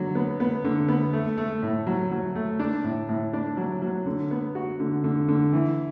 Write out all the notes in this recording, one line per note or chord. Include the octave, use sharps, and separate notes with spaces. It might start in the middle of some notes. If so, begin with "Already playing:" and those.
Already playing: D3 F#3
B3
B3
D3
B3
A3
A3
A2
F#3
F#3
A3
D4
A2
A2
D4
F#3
F#3
D3
B3
F#4
D3
D3
D3
E3